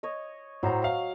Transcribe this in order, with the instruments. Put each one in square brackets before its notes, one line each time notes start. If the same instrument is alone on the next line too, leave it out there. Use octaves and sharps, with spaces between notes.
[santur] C#5 D#5
[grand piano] A2 C5 A#5 [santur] F#3
[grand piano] F5